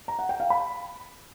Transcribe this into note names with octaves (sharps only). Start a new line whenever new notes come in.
A#5
F#5
G5
F5
B5